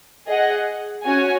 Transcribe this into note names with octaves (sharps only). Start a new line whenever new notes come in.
G#4 D#5 F#5
C#4 F#4 C#5 G#5